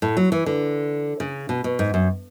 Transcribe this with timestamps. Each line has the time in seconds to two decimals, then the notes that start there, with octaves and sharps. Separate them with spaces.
0.02 A2
0.17 F#3
0.32 E3
0.46 D3
1.20 C#3
1.49 B2
1.64 B2
1.79 G#2
1.94 F#2